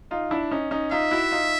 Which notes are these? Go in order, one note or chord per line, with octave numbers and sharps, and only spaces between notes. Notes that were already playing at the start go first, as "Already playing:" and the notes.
D#4 F4
D4 E4
C#4 D#4
C#4 D#4
D#4 F4 E5
E4 F#4
D#4 F4